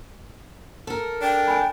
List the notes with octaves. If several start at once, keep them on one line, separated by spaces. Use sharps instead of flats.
A4 A#4
D4 G5
G#5 B5